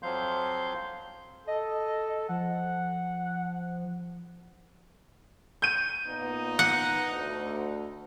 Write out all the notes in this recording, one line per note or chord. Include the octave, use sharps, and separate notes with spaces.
F2 F3 F#3 F5 C6 G6
A4 D#5
F3 F#5
G6 D#7
A#2 B3 D#4
F#5
D2